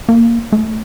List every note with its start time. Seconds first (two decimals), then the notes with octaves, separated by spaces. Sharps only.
0.09 A#3
0.52 A3